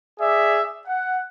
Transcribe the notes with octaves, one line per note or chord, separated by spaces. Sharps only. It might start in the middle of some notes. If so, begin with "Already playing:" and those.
G#4 D5 E5
F#5